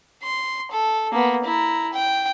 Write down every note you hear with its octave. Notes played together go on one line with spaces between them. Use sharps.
C6
A4
A#3 B3
E4 A#5
G5